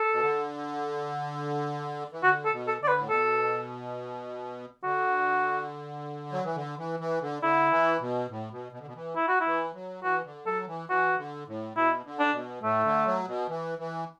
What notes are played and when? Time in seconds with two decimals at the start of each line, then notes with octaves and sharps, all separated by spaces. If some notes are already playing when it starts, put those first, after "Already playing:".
Already playing: A4
0.12 B2
0.22 D3
2.12 E3
2.23 D3 F#4
2.45 A4
2.52 B2
2.67 A4
2.82 D3 D5
2.88 B4
2.98 A2
3.10 B2 A4
4.83 D3 F#4
6.32 F#3
6.44 E3
6.56 D3
6.78 E3
7.00 E3
7.21 D3
7.42 D3 E4
7.71 E3
8.01 B2
8.30 A2
8.51 B2
8.72 B2
8.79 D3
8.87 B2
8.95 E3
9.16 E4
9.28 F#4
9.40 E4
9.46 E3
9.74 F#3
10.03 E3 F#4
10.25 D3
10.46 F#3 A4
10.67 E3
10.89 E3 F#4
11.18 D3
11.47 A2
11.76 B2 E4
12.05 D3
12.19 D4
12.33 B2
12.63 A2 A3
12.84 D3
13.06 F#3
13.28 B2
13.49 E3
13.78 E3